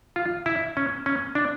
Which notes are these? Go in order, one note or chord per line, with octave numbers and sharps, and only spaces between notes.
F4
E4
C#4
C#4
D4